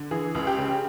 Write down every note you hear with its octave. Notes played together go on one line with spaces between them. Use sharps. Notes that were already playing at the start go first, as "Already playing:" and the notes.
Already playing: D3
E3 G#4
C#2
G4
C#3